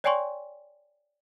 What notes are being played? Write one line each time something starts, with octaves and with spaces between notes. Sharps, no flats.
C#5 D5 G5 G#5 C6 C#6